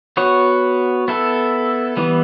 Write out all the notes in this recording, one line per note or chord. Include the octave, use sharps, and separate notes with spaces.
B3 F#4 C#5
B3 E4 A4
E3 G3 B3